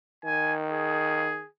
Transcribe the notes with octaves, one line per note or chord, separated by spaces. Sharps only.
D#3 G#5
G#4